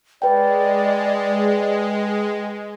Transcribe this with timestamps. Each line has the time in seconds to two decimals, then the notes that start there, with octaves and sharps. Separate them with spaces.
0.22 G#3 B4 D5 G5